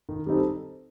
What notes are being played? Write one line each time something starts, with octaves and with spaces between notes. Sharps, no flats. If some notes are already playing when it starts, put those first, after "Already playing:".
D#3
G3 C4 D#4 A4